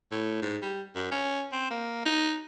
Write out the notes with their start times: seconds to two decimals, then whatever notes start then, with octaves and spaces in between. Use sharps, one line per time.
0.11 A2
0.42 G#2
0.62 G3
0.95 F#2
1.12 C#4
1.52 C4
1.70 A#3
2.05 D#4